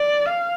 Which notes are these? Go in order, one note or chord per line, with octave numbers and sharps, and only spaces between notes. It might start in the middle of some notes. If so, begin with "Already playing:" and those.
Already playing: D5
F5